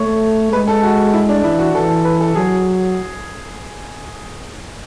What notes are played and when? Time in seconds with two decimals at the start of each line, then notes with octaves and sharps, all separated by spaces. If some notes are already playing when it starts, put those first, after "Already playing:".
Already playing: A3 C#5
0.52 G#3 B4
0.68 A4
0.83 F#4
1.14 E4
1.29 D4
1.44 E3 E4
1.59 F#4
1.74 E3 A4
2.05 B4
2.21 A4
2.35 F#3 G#4